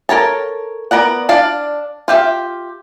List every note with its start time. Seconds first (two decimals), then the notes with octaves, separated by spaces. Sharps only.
0.09 A4 A#4 C#5 A5
0.91 B3 A#4 D5 F#5
1.29 D4 D5 F5 A5
2.08 F4 G4 E5